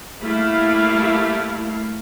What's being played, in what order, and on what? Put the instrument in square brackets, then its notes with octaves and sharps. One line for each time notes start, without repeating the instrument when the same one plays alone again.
[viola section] G3 A3 A#3 E4 F5